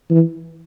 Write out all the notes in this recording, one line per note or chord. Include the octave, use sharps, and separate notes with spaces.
E3